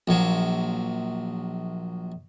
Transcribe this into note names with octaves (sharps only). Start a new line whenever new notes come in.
A#1 F#3